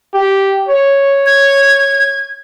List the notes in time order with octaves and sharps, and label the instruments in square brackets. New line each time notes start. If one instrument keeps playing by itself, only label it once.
[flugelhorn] G4
C#5
[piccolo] G#6